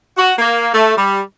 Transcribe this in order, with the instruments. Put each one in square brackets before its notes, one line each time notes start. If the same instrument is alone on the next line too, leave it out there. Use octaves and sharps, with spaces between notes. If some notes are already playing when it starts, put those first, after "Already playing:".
[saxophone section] F#4
A#3
A3
G3